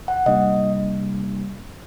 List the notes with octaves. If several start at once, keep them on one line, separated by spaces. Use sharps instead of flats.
F#5
C3 G3 A#3 D4 D#5